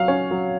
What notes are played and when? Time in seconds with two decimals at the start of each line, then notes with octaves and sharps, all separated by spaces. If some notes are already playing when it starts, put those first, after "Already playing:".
Already playing: F#3 F5
0.08 C#4 C#5
0.31 F#3